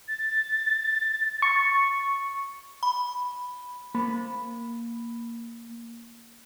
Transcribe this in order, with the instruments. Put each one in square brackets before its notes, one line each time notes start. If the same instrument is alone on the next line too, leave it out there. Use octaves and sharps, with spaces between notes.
[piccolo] A6
[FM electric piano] C#6
[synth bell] B5
[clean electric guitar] A#3 B5